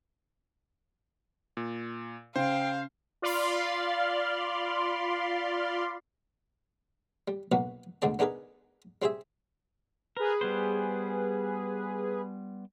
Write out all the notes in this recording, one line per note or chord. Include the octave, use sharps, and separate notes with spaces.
A#2
C#3 C5 F5 G5
F4 D5 F5 B5 C6
G3
B1 B2 A#3 B3 F#4 B4
D2 B2 D3 G#3 D5 A5
B3 D4 D#4 G#4 A#4 B4
G3 C4 G4 G#4 E5
G#4 A#4 B4
G3 B3 C5